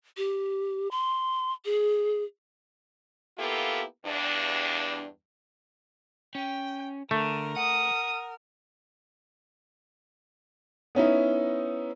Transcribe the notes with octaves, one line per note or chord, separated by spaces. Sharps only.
G4
C6
G#4
A#3 B3 E4 F4 G4 A4
E2 G2 D4
C#4 G5
D3 A3 A#4
F#5 D#6
B3 C#4 D#4 E4